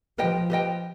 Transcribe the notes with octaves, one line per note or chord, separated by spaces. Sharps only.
F3 G4 B4 D#5 G5
G4 B4 D#5 G5